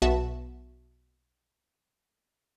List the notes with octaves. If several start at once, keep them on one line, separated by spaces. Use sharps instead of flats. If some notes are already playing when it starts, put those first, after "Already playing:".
B1 B3 F#4 E5 A5